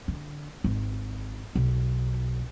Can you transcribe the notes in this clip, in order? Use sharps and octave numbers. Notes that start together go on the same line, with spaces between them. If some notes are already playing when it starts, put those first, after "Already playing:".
D3
G#1
B1